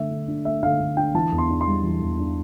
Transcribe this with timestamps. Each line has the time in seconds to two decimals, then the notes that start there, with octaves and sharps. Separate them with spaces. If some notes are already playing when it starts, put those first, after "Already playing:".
Already playing: D3 A3 E5
0.11 D3
0.28 D4
0.45 A3 E5
0.63 D3 F5
0.80 D3
0.97 D4 G5
1.14 E3 A5
1.32 E2
1.38 C6
1.50 D4
1.61 C6
1.67 G3
1.84 E3
2.01 E2
2.19 D4